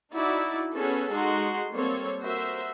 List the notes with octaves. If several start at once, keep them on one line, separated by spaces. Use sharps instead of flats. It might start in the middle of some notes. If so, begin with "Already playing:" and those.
D#4 E4 F#4 D5
B3 C#4 F#4 G#4 A4 B4
G#3 D#4 F#4 C6
G3 A#3 C4 A4 C#5
F#4 A#4 C5 E5